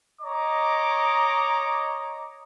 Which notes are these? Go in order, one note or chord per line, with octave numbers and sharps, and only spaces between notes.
C#5 D#5 A#5 D6